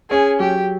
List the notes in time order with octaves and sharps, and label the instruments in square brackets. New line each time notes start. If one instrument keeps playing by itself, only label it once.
[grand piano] C#4 [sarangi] G#4
[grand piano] F#3 [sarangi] G4